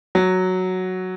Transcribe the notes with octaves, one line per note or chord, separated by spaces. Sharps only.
F#3